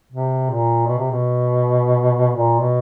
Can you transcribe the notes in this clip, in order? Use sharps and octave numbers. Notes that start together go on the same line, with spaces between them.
C3
A#2
B2
C3
B2
A#2
B2